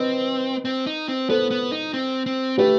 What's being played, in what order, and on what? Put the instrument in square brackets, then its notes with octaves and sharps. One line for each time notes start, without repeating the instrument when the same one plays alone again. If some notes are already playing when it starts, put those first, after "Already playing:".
Already playing: [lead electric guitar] C4 [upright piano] B4 D#5
[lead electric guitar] C4
D#4
C4
[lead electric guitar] B3 [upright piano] A4 C5
[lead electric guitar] B3
D#4
C4
C4
[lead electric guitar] A3 [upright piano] G4 B4